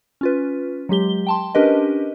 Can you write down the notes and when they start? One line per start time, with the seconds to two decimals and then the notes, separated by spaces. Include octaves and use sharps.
0.21 C#4 F4 B4
0.89 F#3 G#3 G4 G7
1.27 G5 A5 C6
1.55 C#4 D4 G4 A#4 B4 D#5